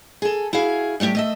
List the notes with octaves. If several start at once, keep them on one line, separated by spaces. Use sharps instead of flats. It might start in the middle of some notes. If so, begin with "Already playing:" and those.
G#4 A4
E4 F#4 G#4 F5
A2 G3 A3 D4 G4
A3 D#5 E5